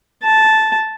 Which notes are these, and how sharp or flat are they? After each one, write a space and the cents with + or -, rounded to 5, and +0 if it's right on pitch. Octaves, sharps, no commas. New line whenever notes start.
A5 -10